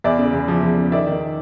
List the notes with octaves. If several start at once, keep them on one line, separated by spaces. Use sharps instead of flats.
E2 D5 E5
C#3
E2
F3
E2
C#3
D#3 D5 E5
D#3